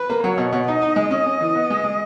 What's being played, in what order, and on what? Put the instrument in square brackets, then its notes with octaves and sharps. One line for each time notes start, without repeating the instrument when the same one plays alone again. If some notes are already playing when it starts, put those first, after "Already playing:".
Already playing: [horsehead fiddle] B4
[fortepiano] A#3
[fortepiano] F#3 [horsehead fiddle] C#5
[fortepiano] B2
B2
[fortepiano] D#4 [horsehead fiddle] D#5
[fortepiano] D#4
G#3
C#4
C#4
E3
B3
G#3
G#3